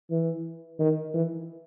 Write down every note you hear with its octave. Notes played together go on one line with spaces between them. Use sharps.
E3
D#3
E3